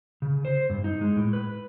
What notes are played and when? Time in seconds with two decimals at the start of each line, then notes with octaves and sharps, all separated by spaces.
0.22 C#3
0.45 C5
0.70 G2
0.84 D#4
1.01 G#3
1.16 A2
1.33 B4